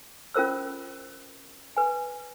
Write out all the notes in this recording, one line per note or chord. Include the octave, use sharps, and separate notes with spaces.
C#4 F4 A#4 C5 E6
B4 G#5